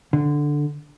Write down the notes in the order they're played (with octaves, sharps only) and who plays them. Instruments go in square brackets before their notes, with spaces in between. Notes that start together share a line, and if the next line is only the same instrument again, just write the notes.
[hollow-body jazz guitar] D3